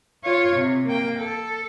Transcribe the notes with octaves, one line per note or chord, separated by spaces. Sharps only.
F4 C#5
C3
A#3 G5
A4